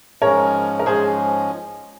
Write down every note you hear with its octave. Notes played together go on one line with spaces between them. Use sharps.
G#2 F3 G#3 C#4 A#4 C#5
A#4
G#2 F3 G#3 C#4 G#4 C5